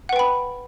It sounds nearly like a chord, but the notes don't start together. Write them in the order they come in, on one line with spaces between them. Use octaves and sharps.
F#5 B4 G5 B5